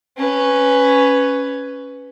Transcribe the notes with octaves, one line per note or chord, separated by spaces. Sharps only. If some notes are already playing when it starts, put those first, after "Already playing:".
C#4 B4